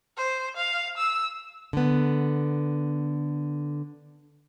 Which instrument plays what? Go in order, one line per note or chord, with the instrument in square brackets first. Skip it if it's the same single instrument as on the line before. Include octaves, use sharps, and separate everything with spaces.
[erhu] C5
F5
E6
[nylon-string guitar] D3 B3